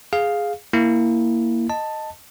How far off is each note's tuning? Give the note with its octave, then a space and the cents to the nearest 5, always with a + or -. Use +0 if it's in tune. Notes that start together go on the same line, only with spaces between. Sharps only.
G#4 +0 F5 +5
A#3 +0 E4 +0
D#5 +0 A5 +10